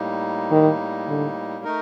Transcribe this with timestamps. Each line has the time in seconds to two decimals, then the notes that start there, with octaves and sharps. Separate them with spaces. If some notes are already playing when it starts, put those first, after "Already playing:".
Already playing: A2 G3 A#3 D#4
0.52 D#3
1.08 D3
1.64 A3 D#4 A#4